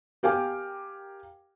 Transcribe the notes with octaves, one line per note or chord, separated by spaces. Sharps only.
G4 A#4 F5 G5 G#5 D6